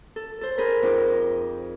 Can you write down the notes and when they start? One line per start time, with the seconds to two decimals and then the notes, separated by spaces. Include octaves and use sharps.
0.16 A4
0.41 A4 C5
0.58 G#4 A#4 C5 B5
0.82 F2 D#4 D6